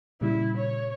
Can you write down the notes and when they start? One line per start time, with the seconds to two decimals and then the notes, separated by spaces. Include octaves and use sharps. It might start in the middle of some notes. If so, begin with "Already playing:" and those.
0.21 A#2 C#3 G3 E4
0.57 C#5